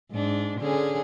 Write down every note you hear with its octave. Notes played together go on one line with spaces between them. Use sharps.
G#2 D4
D3 C#4 G#4